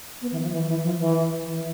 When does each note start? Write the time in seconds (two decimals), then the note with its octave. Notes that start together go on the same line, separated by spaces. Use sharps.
0.22 B3
0.32 E3
0.42 F3
0.52 E3
0.68 E3
0.83 F3
0.99 E3
1.45 E3